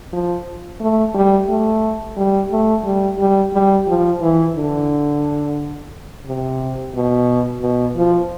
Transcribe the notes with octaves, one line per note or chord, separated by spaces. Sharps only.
F3
A3
G3
A3
G3
A3
G3
G3
G3
F3
E3
D3
C3
B2
B2
F3